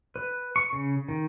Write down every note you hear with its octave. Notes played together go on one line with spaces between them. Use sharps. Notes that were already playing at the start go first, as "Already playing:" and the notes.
B4
C#6
C#3
D#3